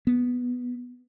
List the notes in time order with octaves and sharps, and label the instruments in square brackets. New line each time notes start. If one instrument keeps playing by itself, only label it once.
[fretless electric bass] B3